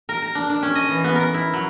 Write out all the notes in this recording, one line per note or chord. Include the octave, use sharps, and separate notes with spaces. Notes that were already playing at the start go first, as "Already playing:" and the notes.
A#4
A#5
D4
D4
C#4
D#5
E3
B3
A#4
E4
F#3